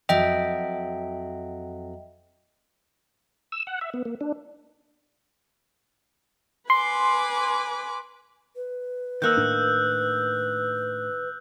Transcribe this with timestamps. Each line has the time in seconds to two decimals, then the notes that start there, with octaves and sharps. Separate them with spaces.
0.09 F2 F#3 D#5 E5 G5
3.52 E6
3.67 F#5
3.81 E5
3.94 B3
4.05 A#3
4.21 D4
6.70 B4 G#5 C6 D6
8.56 B4
9.22 D#3 A#3 E6 F#6 G6
9.37 A2 D4